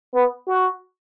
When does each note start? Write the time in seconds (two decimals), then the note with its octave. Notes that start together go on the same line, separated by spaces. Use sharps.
0.14 B3
0.47 F#4